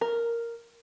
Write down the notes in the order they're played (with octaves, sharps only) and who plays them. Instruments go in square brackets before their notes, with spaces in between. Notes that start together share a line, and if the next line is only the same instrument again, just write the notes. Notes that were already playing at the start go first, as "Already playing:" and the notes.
[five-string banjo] A#4